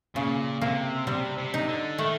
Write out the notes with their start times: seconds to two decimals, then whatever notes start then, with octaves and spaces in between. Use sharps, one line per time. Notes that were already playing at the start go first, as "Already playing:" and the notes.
0.15 A#2 C#3
0.62 C3 A#3
1.07 C3 G3
1.38 C3
1.54 D#4
1.69 D3
1.98 D#3 A3